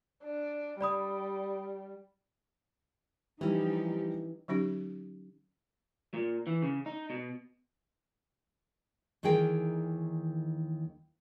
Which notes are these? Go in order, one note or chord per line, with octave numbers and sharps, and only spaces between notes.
D4
G3 D5 B5 D#6
E3 F3 G3 C#4 D#4 G4
D3 F#3 C#4 D#4 G4
A#2
E3
C#3
D#4
B2
D#2 D#3 E3 G#4 A#4 G5